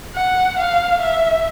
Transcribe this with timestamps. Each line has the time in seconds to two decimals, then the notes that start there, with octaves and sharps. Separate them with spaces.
0.15 F#5
0.58 F5
1.02 E5